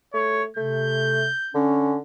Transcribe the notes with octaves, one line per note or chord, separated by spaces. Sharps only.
A3 C#5
C3 A3 G6
D3 C#4